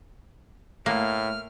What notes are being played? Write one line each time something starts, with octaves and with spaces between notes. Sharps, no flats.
A2 A3 A#3 F6